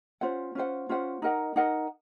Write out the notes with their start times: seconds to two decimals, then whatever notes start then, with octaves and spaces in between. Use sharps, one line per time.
0.21 C#4 F4 C5 F#5
0.55 C#4 F4 C5 F#5
0.89 C#4 F4 C5 F#5
1.22 D#4 A#4 D#5 F#5
1.56 D#4 A#4 D#5 F#5